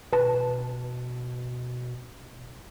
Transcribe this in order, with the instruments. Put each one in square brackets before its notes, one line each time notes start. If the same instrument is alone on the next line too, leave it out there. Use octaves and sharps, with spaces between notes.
[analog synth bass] B2 [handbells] B4 A5